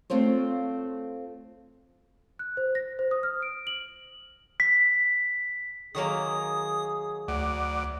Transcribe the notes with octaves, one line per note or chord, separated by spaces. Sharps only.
A3 C4 F4 C5 C#5
F#6
C5
A#6
C5
D#6
F6
D7
F#7
B6
D#3 F#3 A#3 G#4 D#6
D2 D5 F#5 D6